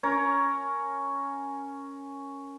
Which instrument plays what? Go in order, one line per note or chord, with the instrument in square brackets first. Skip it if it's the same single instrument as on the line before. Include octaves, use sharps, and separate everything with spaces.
[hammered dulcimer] C#4 A#4 C#5